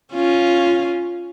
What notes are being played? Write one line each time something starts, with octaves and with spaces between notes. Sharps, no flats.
C#4 F4